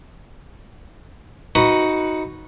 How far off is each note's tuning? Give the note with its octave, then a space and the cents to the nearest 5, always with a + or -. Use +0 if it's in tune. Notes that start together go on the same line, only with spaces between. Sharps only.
D#4 +10 F#4 +0 B4 +0